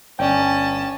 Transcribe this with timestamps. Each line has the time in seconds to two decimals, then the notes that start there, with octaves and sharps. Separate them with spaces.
0.19 G1 C#4 D5 G5 A5